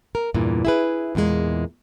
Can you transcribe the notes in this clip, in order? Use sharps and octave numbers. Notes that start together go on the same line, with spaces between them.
A#4
E2 G2 A#2 E3
E4 G#4 B4
E2 A#2 D#3 G#3 A#3